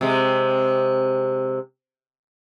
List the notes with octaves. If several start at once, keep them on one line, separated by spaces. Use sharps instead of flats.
C3 G#3